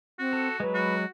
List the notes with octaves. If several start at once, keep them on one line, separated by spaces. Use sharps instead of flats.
C4 F#4
A4
F#3 G#3 B4
F#4